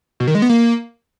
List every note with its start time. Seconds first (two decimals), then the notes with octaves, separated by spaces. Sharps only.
0.20 B2
0.27 D#3
0.35 G#3
0.42 B3
0.49 A#3